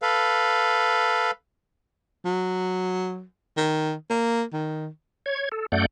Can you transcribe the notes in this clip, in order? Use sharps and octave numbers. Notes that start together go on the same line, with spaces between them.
A4 B4 F5
F#3
D#3
A#3
D#3
C#5 G#6
A4
F#2 A3 D5 F#5 G6